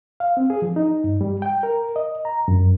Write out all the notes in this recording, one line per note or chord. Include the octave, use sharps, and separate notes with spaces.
F5
C4
G#4
F3
D#4
G2
G3
G5
A#4
D#5
A#5
F#2